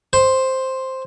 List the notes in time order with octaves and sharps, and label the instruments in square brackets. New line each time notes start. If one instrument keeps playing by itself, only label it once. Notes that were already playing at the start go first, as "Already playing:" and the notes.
[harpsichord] C5